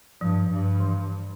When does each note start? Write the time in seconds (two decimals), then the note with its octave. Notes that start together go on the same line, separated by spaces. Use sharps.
0.21 G2 F3
0.50 G2
0.80 E3